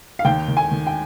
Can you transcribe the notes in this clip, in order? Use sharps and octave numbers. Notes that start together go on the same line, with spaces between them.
F5
D#2 G5
D#3
G#5
D#3
G5